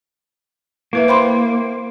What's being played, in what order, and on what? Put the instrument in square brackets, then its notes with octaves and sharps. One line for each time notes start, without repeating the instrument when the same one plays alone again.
[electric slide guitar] A#3 [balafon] E4 B4 E5
[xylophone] C5 B5 C6 [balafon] G5 D6